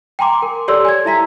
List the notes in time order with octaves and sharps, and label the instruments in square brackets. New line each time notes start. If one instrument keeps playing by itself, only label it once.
[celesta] G5 G#5 A#5 C6 D6
A#4
G4 A4 C#5 D5 C6 E6
G#5 G#6
E4 E5 A#5 B6